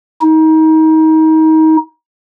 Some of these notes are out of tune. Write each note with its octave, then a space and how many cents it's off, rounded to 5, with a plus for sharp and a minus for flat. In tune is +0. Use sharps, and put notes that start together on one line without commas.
D#4 +30